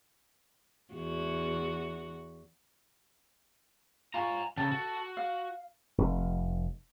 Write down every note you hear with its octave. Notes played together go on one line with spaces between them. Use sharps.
E2 F#4
F4 C#5 G#5 A#5
C#3 A4 A5
F#4
F5
F1